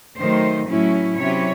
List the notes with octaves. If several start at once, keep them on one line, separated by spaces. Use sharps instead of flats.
D#3 F#3 A3 C5
A2 F#3 C#4 E4
C3 F#3 C#4 E4 C#5